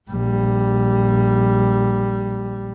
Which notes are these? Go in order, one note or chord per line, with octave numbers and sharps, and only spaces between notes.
A#1 G3